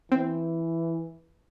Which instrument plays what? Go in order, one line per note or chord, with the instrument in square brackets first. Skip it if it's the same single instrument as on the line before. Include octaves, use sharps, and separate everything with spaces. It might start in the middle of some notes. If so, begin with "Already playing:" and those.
[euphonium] E3 [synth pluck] C4